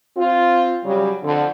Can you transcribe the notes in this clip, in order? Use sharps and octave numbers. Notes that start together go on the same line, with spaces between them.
C4 F4
C#3 F#3 G3
F2 D3